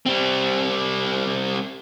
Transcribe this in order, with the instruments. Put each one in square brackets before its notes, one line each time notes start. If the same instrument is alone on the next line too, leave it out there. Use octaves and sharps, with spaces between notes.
[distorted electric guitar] G3 C4